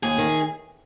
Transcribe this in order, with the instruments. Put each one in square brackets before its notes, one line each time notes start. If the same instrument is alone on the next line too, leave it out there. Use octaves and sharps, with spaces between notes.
[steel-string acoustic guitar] D#2 [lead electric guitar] G#4
[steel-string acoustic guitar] D#3